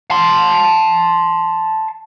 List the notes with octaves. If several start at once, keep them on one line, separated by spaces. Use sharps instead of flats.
A5 C6